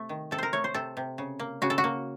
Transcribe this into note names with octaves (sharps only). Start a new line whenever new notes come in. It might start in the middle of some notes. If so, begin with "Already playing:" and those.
Already playing: C3 A3
D#3
C3 A4
A#4 C5
A3 C#5
C5
C3 A4
C3
C#3
A#3
C#3 F#4
A4
F#4
A#3